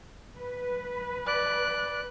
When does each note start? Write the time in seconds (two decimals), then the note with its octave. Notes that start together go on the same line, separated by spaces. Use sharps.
0.36 B4
1.27 D5 F#6